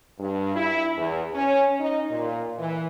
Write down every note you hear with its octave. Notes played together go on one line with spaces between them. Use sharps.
G2
E4
E2
C#4
D#4
A#2
E3